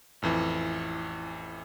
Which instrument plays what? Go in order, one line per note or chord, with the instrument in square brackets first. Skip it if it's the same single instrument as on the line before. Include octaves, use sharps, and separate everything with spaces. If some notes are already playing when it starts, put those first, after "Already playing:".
[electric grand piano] A1 F2 E3